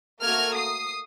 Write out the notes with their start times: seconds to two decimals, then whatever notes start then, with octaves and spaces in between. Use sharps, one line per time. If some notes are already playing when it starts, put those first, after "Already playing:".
0.22 A3 A#3 F#4 A#4 F6 G#6
0.56 D#6 C7